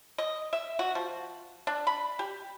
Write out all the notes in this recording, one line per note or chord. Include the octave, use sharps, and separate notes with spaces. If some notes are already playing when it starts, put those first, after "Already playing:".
D#5
E5
F#4
F3
D4
B5
G4